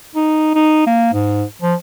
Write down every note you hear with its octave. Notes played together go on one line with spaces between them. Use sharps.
D#4
D#4
A#3
G#2
F3